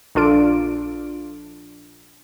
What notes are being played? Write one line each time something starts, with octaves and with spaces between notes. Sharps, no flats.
A#1 D4 F4 A4 D7